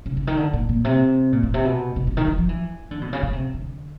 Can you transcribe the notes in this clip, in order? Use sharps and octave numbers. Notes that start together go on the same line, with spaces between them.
C#3
C#3
D#3
D3
A#2
A#2
C3
A#2
A#2
C3
B2
B2
C#3
D#3
E3
F3
E3
D3
B2
C#3
C#3
C3
D3